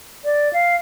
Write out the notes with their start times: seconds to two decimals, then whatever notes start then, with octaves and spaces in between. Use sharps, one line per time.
0.25 D5
0.53 F5